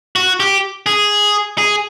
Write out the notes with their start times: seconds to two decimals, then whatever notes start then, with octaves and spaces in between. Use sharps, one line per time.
0.16 F#4
0.40 G4
0.86 G#4
1.58 G#4